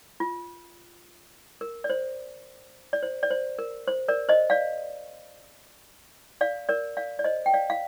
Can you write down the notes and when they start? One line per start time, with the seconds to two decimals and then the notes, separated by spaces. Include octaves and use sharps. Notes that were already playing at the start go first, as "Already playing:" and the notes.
0.20 F4
1.61 A#4
1.84 D5
1.90 C5
2.93 D5
3.03 C5
3.23 D5
3.31 C5
3.59 A#4
3.88 C5
4.08 A#4 D5
4.29 C5 D#5
4.50 D5 F5
6.41 D5 F5
6.69 A#4 D5
6.97 D5 F5
7.19 D5
7.24 C5 D#5
7.46 G5
7.54 D5 F5
7.70 F5